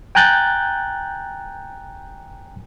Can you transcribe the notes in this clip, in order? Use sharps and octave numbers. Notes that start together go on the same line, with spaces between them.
G5 G#5 A#5 F#6 G6 A6